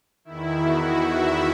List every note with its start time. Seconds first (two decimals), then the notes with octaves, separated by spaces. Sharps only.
0.25 E2 D#3 E4
0.61 F#4
0.97 E5